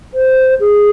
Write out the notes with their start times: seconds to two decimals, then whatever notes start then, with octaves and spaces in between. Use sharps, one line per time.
0.14 C5
0.60 G#4